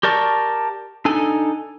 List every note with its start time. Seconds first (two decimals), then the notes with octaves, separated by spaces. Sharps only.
0.03 G4 A#4 D5 A5 C#6
1.05 D4 D#4 A4 G#5